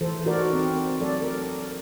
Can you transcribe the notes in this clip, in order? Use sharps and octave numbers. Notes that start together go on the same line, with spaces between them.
E3 A4 C5
D#4 F#4 A#4 D5
C4
F#3 A4 D5
A#4